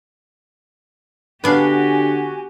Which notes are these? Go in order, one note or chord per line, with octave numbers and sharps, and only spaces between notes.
D3 B3 D4 F#4 G4 F5 G#5